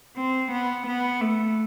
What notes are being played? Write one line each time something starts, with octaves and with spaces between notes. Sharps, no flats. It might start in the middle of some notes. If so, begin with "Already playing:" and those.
C4
B3
B3
A3